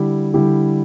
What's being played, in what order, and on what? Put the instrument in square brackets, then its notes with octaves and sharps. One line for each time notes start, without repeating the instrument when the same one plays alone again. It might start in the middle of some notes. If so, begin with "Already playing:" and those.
Already playing: [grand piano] D3 G3 E4 G4
D3 G3 E4 G4